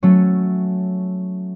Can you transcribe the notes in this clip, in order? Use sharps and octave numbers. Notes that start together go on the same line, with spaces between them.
F#3 A3 C#4